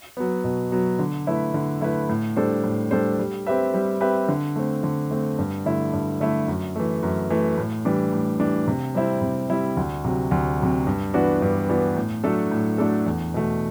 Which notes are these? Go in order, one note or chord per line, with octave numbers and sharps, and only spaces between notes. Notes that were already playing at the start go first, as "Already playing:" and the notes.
F#3 B3
B2
F#3 B3
D3
A3 E4 B4
D3
A3 E4 B4
A2
G3 D4 A4 C5
A2
G3 D4 A4 C5
G3
C4 G4 B4 E5
G3
C4 G4 B4 E5
D3
A3 C4
D3
A3 C4
G2
D3 A3 E4
G2
D3 A3 E4
F#2
E3 A3
F#2
E3 A3
A2
E3 G3 D4
A2
E3 G3 D4
C3
G3 C4 E4
C3
G3 C4 E4
D2
C3 F#3
D2
C3 F#3
G2
E3 B3 D4 F#4
G2
E3 B3 D4 F#4
A2
F#3 A3 D4 A4
A2
F#3 A3 D4 A4
E2
B2 A3